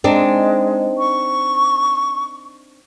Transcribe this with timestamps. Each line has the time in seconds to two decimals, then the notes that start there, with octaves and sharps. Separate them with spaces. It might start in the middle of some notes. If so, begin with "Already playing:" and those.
0.04 G#3 C4 D4 D#4
0.98 C#6